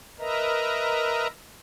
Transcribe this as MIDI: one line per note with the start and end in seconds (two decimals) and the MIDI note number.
0.19 1.27 70
0.19 1.27 71
0.19 1.27 75
0.19 1.27 76
0.19 1.27 82